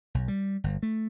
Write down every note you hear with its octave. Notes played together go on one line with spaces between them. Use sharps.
B1
G3
G1
A3